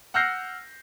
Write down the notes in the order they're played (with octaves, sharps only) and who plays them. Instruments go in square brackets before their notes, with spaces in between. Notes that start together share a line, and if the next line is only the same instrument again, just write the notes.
[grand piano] F#5 E6 F6 G6 A#6 C7